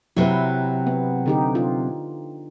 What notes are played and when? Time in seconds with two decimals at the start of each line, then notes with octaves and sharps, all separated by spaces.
0.17 C3 F#3 E4 B4
0.87 B3
1.26 D3 D#4 G4
1.55 F4